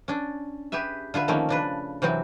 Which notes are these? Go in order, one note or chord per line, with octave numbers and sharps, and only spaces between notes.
C#4 D4
G4 G#4 B4 E5
D3 F4 B4 E5
D#3 F3 A3 A#3 C4 C#4
C#3 D4 B4
C3 E3 F#3 C4